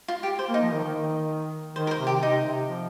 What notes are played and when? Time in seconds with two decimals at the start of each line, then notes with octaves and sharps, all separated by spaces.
0.08 F4
0.23 G4
0.39 C5
0.49 A#3
0.54 D#4
0.62 F3
0.73 D#3
0.84 D#3
1.76 D#3 C5
1.87 A#4
1.91 C5
1.99 C3
2.07 G4
2.22 C3 D#4
2.46 C3
2.68 F3